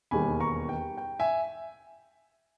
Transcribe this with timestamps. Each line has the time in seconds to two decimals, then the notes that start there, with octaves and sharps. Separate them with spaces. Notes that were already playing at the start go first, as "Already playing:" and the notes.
0.11 E1 D#2 D#3 G3 G#5 B5
0.40 A#5 C#6
0.69 G5
0.98 G5
1.20 E5 G#5